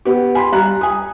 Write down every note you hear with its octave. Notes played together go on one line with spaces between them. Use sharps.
B3 G4
G#5 B5 C6
G3 F5 A#5 F#6
G#5 D#6